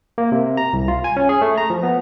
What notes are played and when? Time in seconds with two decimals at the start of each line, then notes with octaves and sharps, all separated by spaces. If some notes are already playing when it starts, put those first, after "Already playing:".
0.18 A#3
0.32 C3
0.57 A#5
0.73 C2
0.88 F4
1.04 G#5
1.17 C#4
1.29 G#4
1.42 A3
1.58 A#5
1.70 F3
1.83 B3